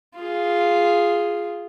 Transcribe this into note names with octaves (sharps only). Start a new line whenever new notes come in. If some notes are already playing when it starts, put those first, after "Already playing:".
F4 G#4